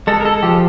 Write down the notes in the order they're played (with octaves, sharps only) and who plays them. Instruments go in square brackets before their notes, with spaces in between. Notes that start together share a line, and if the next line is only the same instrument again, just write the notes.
[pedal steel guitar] G#3 A4
A#4
A4
F3 G4